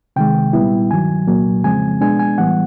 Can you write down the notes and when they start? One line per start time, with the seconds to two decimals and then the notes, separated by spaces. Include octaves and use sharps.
0.16 C3 D#3 G#3 G5
0.53 A#2 G3 B3 E4
0.90 G2 D#3 F#3 G#5
1.27 C2 A#2 F#3 A#3
1.64 F2 C#3 F3 G#3 C4 G#5
2.01 B2 G#3 B3 D4 G#5
2.19 G#5
2.38 A2 E3 G3 B3 F#5